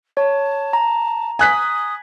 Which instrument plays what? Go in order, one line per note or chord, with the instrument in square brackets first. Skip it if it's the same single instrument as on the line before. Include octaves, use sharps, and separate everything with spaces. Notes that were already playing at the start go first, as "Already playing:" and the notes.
[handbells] C#5 [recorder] A5
[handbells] A#5
[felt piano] G#5 F#6 B6 [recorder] D#6